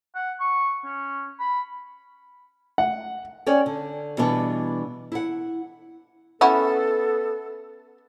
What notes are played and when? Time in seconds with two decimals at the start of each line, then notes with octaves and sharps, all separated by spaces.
0.15 F#5
0.40 C#6
0.84 C#4
1.40 B5
2.78 F#5
3.46 C#4 C#5 D5 G5
3.66 D3
4.17 B2 E3 G3 B3 D4 B4
5.12 E4 F#5
6.41 B3 C#4 E4 F#4 A4